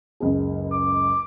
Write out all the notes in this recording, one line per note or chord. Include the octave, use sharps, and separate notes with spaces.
F#1 C#2 G#4
D6